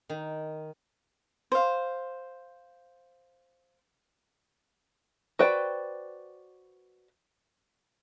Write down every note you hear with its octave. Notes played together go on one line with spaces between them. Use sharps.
D#3
C5 F5
F#4 B4 C5 D5 G5